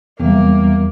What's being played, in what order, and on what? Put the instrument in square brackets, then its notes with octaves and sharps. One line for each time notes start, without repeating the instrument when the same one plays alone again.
[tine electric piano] E2 [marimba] C3 D#3 F#3 [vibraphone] G3 E5 [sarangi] A#3